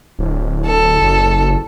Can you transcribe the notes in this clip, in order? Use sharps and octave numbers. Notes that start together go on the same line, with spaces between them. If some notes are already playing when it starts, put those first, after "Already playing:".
D1
A4
F#1